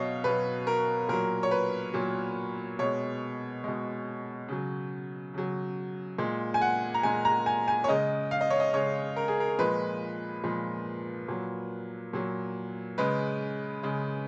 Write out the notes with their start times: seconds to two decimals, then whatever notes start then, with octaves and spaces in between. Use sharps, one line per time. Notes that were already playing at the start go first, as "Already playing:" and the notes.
Already playing: B2 F#3 C#5 D#5 F5
0.24 B2 F#3 B4
0.67 A#4
1.09 A#2 F#3 A#4
1.43 C#5
1.51 B4
1.94 A#2 F#3
2.79 B2 G#3 C#5
3.64 B2 G#3
4.48 C#3 F#3
5.34 C#3 F#3
6.18 A#2 G#3
6.54 G#5
6.62 F#5
6.94 A#5
7.03 A#2 G#3 G#5
7.25 A#5
7.46 G#5
7.68 G#5
7.84 C#5
7.88 C#3 G#3 D#5
8.31 F5
8.41 D#5
8.50 C#5
8.60 D#5
8.73 C#3 G#3 C#5
9.16 A#4
9.28 G#4
9.40 A#4
9.59 A#2 F3 G#3 B4
10.44 A#2 F3 G#3
11.28 A#2 F#3
12.13 A#2 F#3
12.98 C#3 G#3 B4
13.83 C#3 G#3